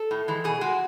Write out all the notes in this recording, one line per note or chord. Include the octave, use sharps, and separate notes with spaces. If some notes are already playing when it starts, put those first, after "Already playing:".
Already playing: A4
A2
E3 G#3
B2 G#4
G#3 F#4